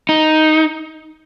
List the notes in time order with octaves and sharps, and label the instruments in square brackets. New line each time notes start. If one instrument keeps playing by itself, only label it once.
[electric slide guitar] D#4